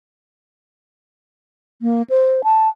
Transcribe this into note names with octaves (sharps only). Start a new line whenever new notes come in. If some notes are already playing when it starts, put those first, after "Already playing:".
A#3
C5
A5